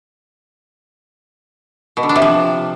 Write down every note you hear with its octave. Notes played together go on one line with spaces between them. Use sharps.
B2
D3
D4
C3
F3